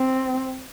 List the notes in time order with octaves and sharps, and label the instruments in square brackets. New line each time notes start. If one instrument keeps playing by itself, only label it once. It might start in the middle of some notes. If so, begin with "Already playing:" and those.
Already playing: [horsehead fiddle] C4